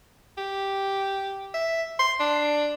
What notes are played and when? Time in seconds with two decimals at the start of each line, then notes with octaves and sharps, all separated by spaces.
0.38 G4
1.54 E5
1.99 C6
2.20 D4